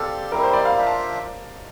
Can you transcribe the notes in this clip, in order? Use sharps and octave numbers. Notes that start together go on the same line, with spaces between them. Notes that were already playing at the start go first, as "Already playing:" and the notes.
Already playing: C4 G4 A4 D5 F5
G3 C4 E4 G4 A#4
C5
D5
F5
D4 F4 C5 E5
A5